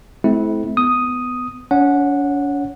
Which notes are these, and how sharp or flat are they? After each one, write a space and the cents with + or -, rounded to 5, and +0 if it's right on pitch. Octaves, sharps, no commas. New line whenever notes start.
A3 -45 C4 -20 E4 -20
B3 +15 D#6 +0
C#4 +45 C#5 -5 F#5 -10